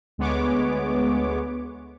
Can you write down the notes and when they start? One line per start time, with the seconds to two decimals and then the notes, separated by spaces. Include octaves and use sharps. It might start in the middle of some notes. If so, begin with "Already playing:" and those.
0.18 D2 G#3 B3 C#5 D6